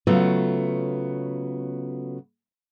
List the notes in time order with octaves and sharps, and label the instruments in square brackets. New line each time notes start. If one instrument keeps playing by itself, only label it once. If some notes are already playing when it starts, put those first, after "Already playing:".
[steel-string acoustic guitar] C#3 F#3 A3 B3 F4